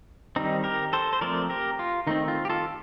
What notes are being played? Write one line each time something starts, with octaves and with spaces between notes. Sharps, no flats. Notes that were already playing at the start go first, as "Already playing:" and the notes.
D#3 G3 C4 D#4
G4 A#4
A4 C5
C5
F3 A3 C4 A#4 D5
G4 A#4
F4
D#3 A3 C4 D#4
F4
G4
F4 A4